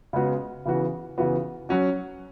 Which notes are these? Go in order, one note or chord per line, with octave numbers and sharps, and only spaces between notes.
C#3 G#3 B3 F#4
C#3 E3 B3 F#4
C#3 E3 B3 F#4
F#3 C#4 F#4